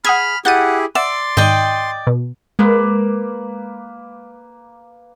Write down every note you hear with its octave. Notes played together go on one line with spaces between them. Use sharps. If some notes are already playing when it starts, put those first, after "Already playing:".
G#4 F#5 B5 D#6 F6 G#6
E4 G4 G#4 F#5 G6 A6 D#7
D5 E5 F#5 C6 E6
G#2 D#3 D#4 D5 D#5 G5
B2
G#3 A#3 B4